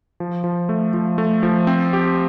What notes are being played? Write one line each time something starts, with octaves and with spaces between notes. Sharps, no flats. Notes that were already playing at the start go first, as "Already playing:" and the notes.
F3
F3
A3
F3
A3
F3
C4
G4